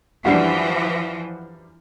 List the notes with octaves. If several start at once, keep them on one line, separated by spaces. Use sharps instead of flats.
F#2 E3 F3 G3 D4 F#4